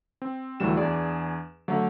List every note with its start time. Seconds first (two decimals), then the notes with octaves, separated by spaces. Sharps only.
0.22 C4
0.60 D2 A2 E3 F#3 G3 E7
0.77 E2 D4 G#4 D5
1.68 D3 F#3 A3